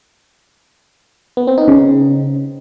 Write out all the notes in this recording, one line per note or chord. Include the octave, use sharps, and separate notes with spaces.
B3
C4
D#4
C#3